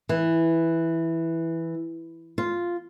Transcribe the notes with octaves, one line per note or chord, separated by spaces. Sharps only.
E3
F4